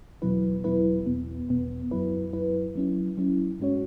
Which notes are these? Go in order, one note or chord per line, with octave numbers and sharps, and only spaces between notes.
E2 B2 F#3 E4 B4
E2 B2 F#3 E4 B4
E2 B2 B3
E2 B2 B3
F#2 F#3 E4 B4
F#2 F#3 E4 B4
F#3 C#4 E4
F#3 C#4 E4
G#2 G#3 C#4 F#4 C#5